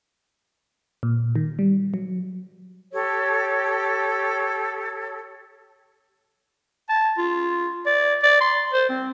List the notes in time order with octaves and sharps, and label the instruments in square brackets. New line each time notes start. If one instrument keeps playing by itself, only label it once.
[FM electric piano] A#2
D#3
G3
F#3
[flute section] G4 A4 C#5
[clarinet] A5
F4
D5
D5
C6
C5
C4